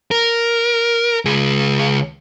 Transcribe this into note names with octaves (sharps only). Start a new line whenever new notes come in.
A#4
C#2 G#4